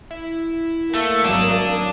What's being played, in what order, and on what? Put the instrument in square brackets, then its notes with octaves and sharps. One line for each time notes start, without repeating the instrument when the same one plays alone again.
[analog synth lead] E4
[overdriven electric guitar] A3 [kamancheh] A#3
[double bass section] G#1 F#3 [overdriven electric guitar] D4 [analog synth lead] D#6